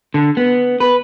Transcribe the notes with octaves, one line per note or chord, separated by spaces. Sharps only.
D3
B3
B4